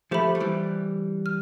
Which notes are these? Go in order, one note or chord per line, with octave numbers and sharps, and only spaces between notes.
F3 A3 G4 C5 E5 B5
A3
E3 G3
F6